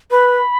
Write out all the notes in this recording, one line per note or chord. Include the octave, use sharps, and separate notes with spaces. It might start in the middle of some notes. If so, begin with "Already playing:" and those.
B4 B5